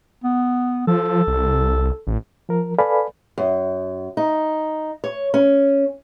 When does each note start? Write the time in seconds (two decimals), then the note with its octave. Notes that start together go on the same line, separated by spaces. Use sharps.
0.24 B3
0.87 F3 A4
1.27 C2
2.07 A1
2.49 F3 A#4
2.79 A4 B4 D5 F5 G#5 B5
3.38 F#2
4.17 D#4
5.04 C#5
5.34 C#4